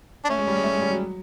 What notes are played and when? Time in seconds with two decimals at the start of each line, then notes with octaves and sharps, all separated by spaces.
0.25 D4
0.29 A3 C#4
0.38 G#3
0.47 G3
0.56 G#3
0.63 A3
0.73 G#3
0.81 G3
0.90 F#3